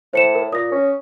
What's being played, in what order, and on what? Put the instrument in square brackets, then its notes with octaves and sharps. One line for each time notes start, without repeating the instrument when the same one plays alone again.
[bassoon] A2 [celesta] C5 C#7 E7
[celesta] A#4
[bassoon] A#2 [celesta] D#6 A#6
[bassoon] C#4